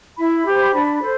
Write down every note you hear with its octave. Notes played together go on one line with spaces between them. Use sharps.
E4 B5
G4 C5
D4
A4 C5